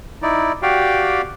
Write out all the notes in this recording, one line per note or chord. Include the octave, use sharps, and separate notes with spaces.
D#4 E4 D5
F#4 G4 D5 F5 G5